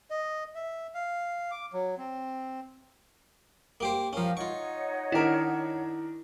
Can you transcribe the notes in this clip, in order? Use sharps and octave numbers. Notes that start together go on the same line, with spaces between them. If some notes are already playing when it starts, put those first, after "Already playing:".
D#5
E5
F5
D6
F#3
C4
A#3 G4 C5
F3 C#4 G4 A#4 F5
D#4 F4 C#5 F#5 C#6
D#3 D4 E4 A#4